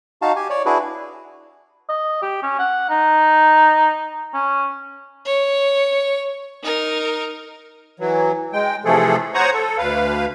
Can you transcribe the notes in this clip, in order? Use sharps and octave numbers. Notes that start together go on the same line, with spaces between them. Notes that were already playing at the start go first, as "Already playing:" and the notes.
D#4 F#4 F5 A5
G4 G#5
C#5 D5
D4 E4 F#4 G#4 B4
D#5
G4
C#4
F#5
D#4
C#4
C#5
D#4 A#4
E3 F#3
G#3 G5
C3 E3 F3 A3 G#4 A4
C5 C#5 F#5 A#5 C#6 D#6
A4
D2 B4 F5